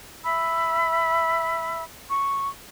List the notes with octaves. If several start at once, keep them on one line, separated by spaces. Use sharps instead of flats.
E5 B5 E6
C#6